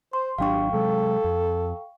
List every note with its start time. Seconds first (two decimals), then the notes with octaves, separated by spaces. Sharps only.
0.13 C5 C6
0.38 G#1 F#3 D4 G4 F5 G5 C#6
0.73 C3 F#3 G#3 A4
1.24 F2